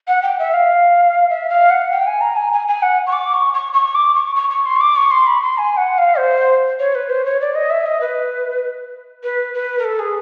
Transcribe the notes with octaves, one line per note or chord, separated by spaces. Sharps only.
F#5
G5
E5
F5
E5
F5
F#5
G5
G#5
A#5
G#5
G#5
G#5
F#5
C#6
D6
C#6
C#6
C#6
D6
C#6
C#6
C#6
C6
C#6
D6
C#6
C6
B5
C6
G#5
F#5
F5
C5
C#5
B4
C5
C#5
D5
D#5
E5
D#5
B4
B4
B4
A#4
A4
G#4